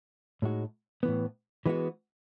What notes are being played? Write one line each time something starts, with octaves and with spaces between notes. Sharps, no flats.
A2 G#3 D#4 F#4
A2 E3 B3
E3 G#3 B3 F#4